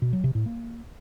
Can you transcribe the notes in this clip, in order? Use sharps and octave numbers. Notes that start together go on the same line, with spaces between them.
B2
F#3
C3
A2
A#3